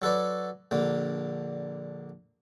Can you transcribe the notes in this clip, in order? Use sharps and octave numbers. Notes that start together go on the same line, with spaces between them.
F#3 A4 B4 D5
A#1 D3 A#3